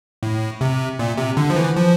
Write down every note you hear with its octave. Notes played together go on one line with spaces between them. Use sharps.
A2
C3
A#2
C3
D3
F3
E3
F3